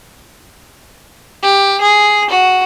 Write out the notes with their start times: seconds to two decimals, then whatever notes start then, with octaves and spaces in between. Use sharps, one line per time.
1.42 G4
1.81 G#4
2.30 F#4